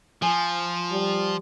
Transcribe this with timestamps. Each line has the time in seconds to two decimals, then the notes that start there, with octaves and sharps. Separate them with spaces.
0.22 F3 G#5
0.91 G3